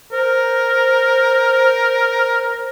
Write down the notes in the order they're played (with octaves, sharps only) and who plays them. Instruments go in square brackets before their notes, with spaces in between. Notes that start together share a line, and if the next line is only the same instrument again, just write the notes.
[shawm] A#4 [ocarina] C5